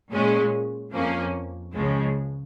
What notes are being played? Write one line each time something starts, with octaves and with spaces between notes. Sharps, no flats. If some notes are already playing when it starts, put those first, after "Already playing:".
A#2 G#3 C#4
F2 F3 A#3 C#4
C#2 C#3 F3 G#3